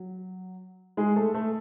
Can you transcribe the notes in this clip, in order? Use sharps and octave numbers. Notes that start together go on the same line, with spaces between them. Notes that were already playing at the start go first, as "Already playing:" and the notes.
Already playing: F#3
G#3 G#4
A3 A4
A3 A4